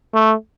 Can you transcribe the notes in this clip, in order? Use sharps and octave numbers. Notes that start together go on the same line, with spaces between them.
A3